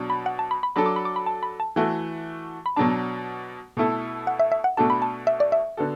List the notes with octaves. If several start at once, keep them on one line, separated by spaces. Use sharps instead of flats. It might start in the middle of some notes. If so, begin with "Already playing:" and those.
Already playing: B2 F#3 D4
B5
F#5
A5
B5
B5
F#3 D4 A4 B5
D6
B5
D6
B5
A5
B5
A5
E3 A3 F#4
B5
B2 F#3 D4 A5
B2 A3 E4 A4
F#5
E5
E5
F#5
B2 A3 D4 F#4 A4 A5
B5
A5
E5
D5
E5
D3 B3 F#4 A4